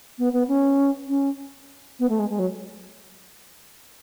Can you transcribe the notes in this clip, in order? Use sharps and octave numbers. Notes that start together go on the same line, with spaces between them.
B3
B3
C#4
C#4
B3
A3
G#3
G#3
F#3